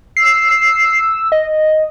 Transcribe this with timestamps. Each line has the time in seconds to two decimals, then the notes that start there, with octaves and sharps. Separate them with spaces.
0.17 E6 C7
1.32 D#5